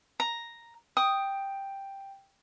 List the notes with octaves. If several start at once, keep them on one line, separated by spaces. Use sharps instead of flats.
A#5
G5 D#6